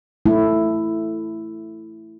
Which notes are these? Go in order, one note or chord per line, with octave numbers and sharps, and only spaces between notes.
A3 E4